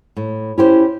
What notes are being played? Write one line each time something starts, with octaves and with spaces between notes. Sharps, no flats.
A2
C#4 E4 G4 C5